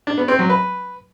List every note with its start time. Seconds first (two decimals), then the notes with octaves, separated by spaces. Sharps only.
0.07 D4
0.18 B3
0.28 C4
0.39 F#3
0.50 B4